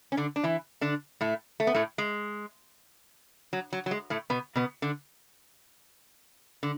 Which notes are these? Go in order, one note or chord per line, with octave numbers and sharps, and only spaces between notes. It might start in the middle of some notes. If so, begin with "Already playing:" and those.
C#4
D3 D4
D4
E3 E4
D3 D4
A2 A3
A3
B3
A2 A3
G#3
F#3
F#3
F#3
G#3
A2 A3
B2 B3
B2 B3
D3 D4
D3